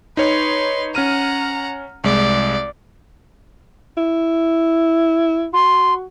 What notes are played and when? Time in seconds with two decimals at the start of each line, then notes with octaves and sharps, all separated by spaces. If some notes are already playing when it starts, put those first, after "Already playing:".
0.17 D#4 B4 C#5 C6
0.95 C#4 F#5 A#5 F6 D#7
2.04 C2 G#3 D5
3.97 E4
5.53 F#4 C6